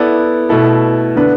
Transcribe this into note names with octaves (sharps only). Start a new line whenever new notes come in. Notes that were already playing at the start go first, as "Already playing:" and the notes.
Already playing: B3 E4 A4 D5
B2 A3 E4 A4
D3 B3 D4 B4